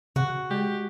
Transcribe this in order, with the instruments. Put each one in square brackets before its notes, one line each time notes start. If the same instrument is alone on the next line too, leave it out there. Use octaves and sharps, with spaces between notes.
[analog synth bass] C#3 [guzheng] F#4
[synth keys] G#3 [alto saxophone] G4